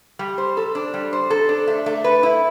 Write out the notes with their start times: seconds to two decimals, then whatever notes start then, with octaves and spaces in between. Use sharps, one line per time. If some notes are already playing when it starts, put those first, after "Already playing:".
0.19 G3
0.38 C5
0.57 A4
0.75 D4
0.94 G3
1.13 C5
1.30 A4
1.49 D4
1.67 A3
1.86 A3
2.04 B4
2.23 E4